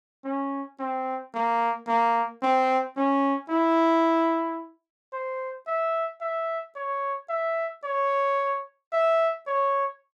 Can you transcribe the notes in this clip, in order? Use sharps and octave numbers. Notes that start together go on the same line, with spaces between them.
C#4
C4
A#3
A#3
C4
C#4
E4
C5
E5
E5
C#5
E5
C#5
E5
C#5